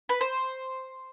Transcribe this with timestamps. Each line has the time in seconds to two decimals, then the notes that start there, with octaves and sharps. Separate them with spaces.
0.09 B4
0.21 C5